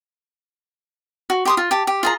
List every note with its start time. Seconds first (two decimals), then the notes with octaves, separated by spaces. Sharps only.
1.30 F#4
1.45 G4 C6 D#6
1.57 F4
1.71 G4 A5
1.87 G4
2.03 F4 G#4 A#5